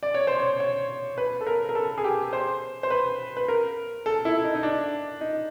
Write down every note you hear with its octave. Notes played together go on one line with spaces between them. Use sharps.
D5
C#5
C5
C#5
C#5
B4
A4
A#4
A#4
A4
G#4
G4
C5
C5
B4
B4
A#4
A4
E4
D#4
D#4
D4
D#4